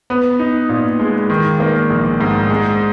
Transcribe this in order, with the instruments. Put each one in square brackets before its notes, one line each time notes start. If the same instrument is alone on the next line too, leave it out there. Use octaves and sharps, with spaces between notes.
[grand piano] B3
D#4
A#2
G#3
D#3
A#3
A#1
G#2
G#3